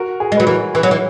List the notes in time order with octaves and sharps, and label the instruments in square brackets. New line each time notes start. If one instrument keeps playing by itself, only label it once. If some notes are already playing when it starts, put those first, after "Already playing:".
Already playing: [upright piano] F#4 A#4
G#4
[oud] G#3
[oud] F#3 [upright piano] B4
[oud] E3 [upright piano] F#4 A#4
[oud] E3 [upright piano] G#4 B4
[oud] F#3
E3